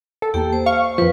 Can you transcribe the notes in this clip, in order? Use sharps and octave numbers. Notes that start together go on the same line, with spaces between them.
A4
E2 A#3 G4 G5
C5
F5 C#6
F2 F3 B4